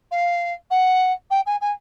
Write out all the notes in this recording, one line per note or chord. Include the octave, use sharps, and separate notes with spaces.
F5
F#5
G5
G#5
G#5